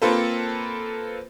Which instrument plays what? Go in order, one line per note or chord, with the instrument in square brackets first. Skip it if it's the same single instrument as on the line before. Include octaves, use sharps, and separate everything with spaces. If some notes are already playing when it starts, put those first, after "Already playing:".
[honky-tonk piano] A#3 C4 F4 A4 B4 C5